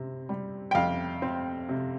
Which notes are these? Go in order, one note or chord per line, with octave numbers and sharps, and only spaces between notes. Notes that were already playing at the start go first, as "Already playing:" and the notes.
Already playing: C3 C4
G3
G5
F2 F5
C4
C3